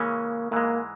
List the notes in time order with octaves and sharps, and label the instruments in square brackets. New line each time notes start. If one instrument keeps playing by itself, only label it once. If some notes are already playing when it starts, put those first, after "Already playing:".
Already playing: [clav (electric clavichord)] C#3 E3 G#3 C#4 [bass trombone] A#3
[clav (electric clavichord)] G#2 E3 G#3 [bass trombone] A#3